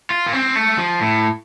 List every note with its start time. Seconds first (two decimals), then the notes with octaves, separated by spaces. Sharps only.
0.10 F4
0.27 A#3
0.33 C4
0.56 A3
0.78 F3
1.01 A2